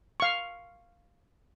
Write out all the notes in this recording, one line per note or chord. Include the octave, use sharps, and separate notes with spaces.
F5 C#6